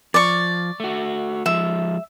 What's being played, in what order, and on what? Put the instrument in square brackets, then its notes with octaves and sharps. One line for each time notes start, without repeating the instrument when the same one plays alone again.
[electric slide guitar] F3 [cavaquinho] D5 C#6
[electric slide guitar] A3 F#4
[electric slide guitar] F3 G#3 [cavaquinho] E5